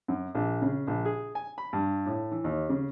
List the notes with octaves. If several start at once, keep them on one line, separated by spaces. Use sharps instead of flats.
F#2
A#1
C#3
A#1
G#4
G#5
B5
G2
A2
E3
D#2
C#3